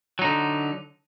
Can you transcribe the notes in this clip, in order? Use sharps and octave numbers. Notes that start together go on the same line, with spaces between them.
D3 F#3 D#4